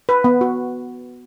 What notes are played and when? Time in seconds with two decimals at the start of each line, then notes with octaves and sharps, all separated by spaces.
0.09 B4
0.24 B3
0.41 F#4